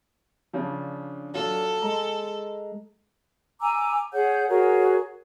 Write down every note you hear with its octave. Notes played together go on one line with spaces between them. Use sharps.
C#3 F3 D4
F#3 F4 A4 E7
G#3 A#5
G#5 A#5 D6 E6
G#4 C#5 F#5 G6
F#4 G#4 A#4 C#5